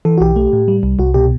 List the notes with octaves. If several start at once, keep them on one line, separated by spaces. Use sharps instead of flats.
E3 A4
F#4
B1 G4
A3
A2
G3
C2
C2 F#4
B2 G4